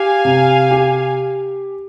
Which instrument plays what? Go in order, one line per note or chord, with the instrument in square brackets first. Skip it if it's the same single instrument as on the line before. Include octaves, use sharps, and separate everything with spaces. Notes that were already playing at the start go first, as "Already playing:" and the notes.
Already playing: [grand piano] G4 [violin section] F5 G#5
[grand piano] C3
G4